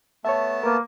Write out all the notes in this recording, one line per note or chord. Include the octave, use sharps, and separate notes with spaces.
A3 B3 C#5 E5 A5
A#3 A#4 B4